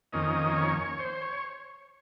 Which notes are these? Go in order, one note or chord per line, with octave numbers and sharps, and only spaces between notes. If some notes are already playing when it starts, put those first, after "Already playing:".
F2 D#3 A#3 C#4 D#5
C#5
C5
C#5